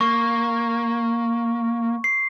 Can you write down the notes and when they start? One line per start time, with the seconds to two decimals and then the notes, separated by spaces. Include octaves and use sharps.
0.01 A#3 C#6
2.04 C7